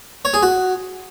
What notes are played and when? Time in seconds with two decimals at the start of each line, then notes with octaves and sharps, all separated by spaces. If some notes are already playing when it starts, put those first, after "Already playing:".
0.25 C#5
0.34 G#4
0.43 F#4